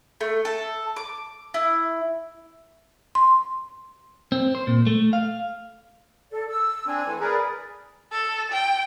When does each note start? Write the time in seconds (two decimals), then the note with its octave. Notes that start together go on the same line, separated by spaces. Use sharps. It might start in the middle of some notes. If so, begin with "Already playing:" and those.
0.21 A3
0.45 A4
0.96 D6
1.54 E4
3.15 C6
4.32 C4
4.55 C5
4.67 A#2
4.87 A3
5.13 F5
6.31 A4 D5
6.46 E6
6.87 C4 D4 G#5
7.06 E3 A3
7.20 G#4 A#4 B4 D5
8.12 A4
8.51 G5